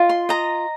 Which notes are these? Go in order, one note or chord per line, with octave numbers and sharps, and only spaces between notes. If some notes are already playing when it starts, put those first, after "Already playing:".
Already playing: F4 D#5
C6
D#5 A#5